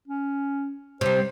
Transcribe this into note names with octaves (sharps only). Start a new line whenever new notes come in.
C#4
C3 G3 C5